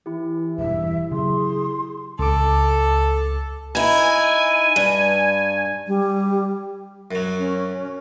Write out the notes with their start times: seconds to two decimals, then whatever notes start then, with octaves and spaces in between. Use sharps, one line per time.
0.06 E3 E4 G4
0.59 E1 E2 G2 E5
1.11 C#3 F#3 G#4 C6
2.19 C#2 A4 D6
3.75 D#4 E4 G#5
4.76 G2
5.87 G3
7.11 F#2 F#3
7.39 C#4